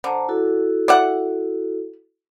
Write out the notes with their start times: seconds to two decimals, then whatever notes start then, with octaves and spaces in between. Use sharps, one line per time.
0.04 D3 C5 A5 A#5
0.29 E4 F#4 A4
0.88 D5 E5 F#5